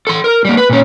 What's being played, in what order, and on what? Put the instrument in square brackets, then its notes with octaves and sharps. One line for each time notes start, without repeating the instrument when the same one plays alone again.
[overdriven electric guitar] A4 C6
A#4
G3 A#3
B4
A#2 C#4